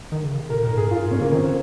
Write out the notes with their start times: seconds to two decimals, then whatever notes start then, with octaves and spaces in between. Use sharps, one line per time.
0.12 D#3
0.24 C#3
0.38 C3
0.50 A#2 A#4
0.64 A#4
0.70 G#2
0.77 G#4
0.91 G2 F4
1.01 G#2
1.11 C3 C#4
1.21 C#3 A#3
1.32 D#3 C4